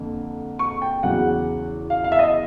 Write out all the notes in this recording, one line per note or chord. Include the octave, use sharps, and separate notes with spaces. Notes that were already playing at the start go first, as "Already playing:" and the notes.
Already playing: F2 D3 A#3
C#6
G5
E2 C#3 F#3 F#5
F5
F5
E5
D#5